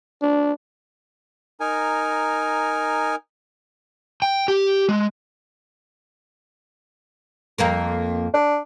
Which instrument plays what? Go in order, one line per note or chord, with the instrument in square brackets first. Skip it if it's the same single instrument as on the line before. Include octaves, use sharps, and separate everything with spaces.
[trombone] D4
[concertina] D#4 A#4 G#5
[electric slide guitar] G5
G4
G#3
[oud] F2 A#3 A#4
[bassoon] D4